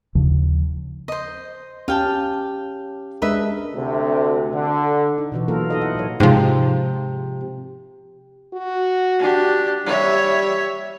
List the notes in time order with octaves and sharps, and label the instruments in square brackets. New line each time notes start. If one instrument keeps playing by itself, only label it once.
[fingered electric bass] D#2 C#3 F3
[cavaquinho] C5 D#5
[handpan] C#4 G4 [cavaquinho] F5 G5 A5
[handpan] G#3 D4 A#4 [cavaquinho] B4 D#5 E5
[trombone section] D2 C3
D3
[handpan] D#4
B2 E3 F#4
F#3 A#3 F4 A4 A#4
D#4 A4 D#5
E4 F#5
A#2 F#3 C#5
[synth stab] G#2 F3 [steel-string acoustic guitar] C3
[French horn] F#4
[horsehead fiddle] D4 G4
[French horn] G3 [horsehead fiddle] C#5 E5